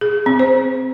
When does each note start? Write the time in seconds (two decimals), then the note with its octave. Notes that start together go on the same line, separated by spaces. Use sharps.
0.01 G#4
0.26 C4
0.39 C5